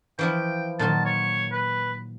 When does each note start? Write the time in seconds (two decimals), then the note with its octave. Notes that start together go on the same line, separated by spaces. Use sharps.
0.19 E3 F3 E4 G5
0.79 A#2 D#3 F#3 A5
1.05 C#5
1.52 B4